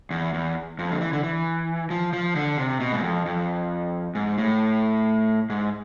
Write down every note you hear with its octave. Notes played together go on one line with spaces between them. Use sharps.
E2
E2
F2
D3
E3
D3
E3
F3
F3
D3
C3
B2
G#2
F2
F2
G#2
A2
G#2